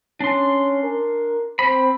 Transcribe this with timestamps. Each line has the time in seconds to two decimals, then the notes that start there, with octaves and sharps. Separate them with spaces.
0.20 C#4 D4 C6
0.83 A#4
1.59 C4 C5 B5